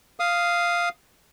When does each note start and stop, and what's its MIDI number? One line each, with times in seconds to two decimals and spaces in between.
0.20 0.89 77
0.20 0.89 87